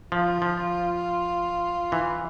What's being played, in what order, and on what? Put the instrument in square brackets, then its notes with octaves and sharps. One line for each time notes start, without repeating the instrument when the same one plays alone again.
[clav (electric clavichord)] F3 [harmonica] F4
[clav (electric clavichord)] F3
E3